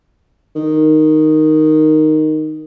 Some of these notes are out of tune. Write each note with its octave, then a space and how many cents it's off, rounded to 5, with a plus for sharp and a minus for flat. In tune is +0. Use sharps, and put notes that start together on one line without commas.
D#3 -5